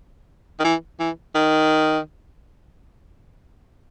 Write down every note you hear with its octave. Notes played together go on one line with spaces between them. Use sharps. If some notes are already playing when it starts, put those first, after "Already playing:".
D#3
E3
E3
D#3